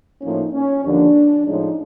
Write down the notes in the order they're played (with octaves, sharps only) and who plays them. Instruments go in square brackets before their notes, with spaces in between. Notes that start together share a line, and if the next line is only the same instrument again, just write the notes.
[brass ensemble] A2 F3 A#3 C#4 D#4
C#4
D#2 D3 F3 A#3 D4
A2 F3 G#3 C#4 D#4